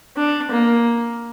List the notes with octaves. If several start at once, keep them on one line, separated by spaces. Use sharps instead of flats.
D4
A#3